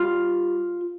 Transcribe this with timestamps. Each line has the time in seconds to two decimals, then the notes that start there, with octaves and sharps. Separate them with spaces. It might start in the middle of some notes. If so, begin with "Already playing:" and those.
Already playing: G3 F4